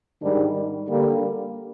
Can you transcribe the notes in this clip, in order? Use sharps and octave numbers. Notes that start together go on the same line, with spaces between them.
G#2 D#3 G3 D4
D3 G3 A#3